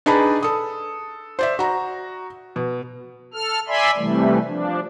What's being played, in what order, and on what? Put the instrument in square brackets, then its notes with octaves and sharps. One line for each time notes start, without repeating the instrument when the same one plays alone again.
[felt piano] D4 D#4 G#4 B4 A5 B5
A4 D#6
C5 D5 E5
F#4 A#5
B2
[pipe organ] A4 F6
D5 E5 G#5 B5 C6
C3 E3 G3 A3
F3 D4